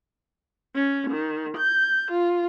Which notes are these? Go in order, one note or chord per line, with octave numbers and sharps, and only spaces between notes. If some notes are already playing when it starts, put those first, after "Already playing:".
C#4
D#3
G6
F4